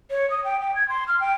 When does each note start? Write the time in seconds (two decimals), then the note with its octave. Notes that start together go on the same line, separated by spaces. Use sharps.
0.11 C#5
0.31 D#6
0.44 G5
0.61 G5
0.76 G#6
0.89 C6
1.08 F6
1.20 G5